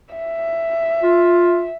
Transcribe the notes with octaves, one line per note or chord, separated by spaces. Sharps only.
E5
F4